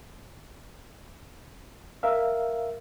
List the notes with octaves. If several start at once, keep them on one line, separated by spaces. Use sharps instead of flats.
A#4 E5 F5